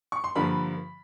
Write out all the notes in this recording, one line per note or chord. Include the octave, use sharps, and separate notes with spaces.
C#6
C6
G2 D3 F3 A#3 B5